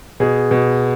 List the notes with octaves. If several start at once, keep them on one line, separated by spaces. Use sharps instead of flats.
B2 G#4
B2